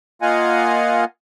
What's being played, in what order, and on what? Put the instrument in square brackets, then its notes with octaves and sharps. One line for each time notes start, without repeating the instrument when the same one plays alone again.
[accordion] A#3 F4 D#5 F5 F#5 G#5